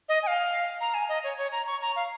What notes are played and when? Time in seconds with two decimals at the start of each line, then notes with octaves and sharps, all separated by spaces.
0.09 D#5
0.23 G#5
0.27 F5
0.81 A#5
0.94 G#5
1.09 D#5
1.24 C#5
1.38 C#5
1.52 A#5
1.67 C#6
1.81 A#5
1.96 F5